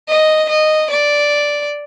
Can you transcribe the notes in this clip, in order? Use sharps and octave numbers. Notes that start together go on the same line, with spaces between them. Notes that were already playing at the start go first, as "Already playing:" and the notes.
D#5
D#5
D5